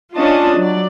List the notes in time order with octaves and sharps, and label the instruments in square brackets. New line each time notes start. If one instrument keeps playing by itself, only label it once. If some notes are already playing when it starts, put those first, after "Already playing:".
[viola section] C#4 D4 F4 D#5 A5
F#3 D5